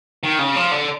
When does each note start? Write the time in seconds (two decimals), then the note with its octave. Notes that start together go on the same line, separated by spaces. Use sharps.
0.23 D#3
0.39 C#3
0.56 F3
0.71 D3